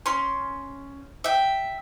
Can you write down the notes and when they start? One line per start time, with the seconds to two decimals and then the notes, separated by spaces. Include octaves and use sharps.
0.06 C#4 C6
1.24 E5 G5